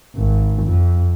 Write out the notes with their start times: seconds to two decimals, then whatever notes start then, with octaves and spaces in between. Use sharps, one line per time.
0.16 G#1
0.63 F2